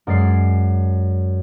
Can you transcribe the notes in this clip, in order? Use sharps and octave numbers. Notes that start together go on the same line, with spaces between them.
F#2 G#3 D5 C7